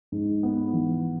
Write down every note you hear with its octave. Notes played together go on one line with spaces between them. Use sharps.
G#2
B3
E3